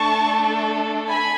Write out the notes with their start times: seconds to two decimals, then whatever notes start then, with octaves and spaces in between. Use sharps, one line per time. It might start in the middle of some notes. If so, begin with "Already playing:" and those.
Already playing: A3 D4 A4 A5 C#6
1.07 G#5 B5